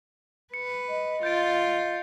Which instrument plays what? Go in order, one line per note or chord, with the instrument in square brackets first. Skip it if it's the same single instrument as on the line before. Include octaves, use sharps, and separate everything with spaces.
[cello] B4 [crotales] C#7
[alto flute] D#5
[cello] F4 [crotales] G6 A6 D7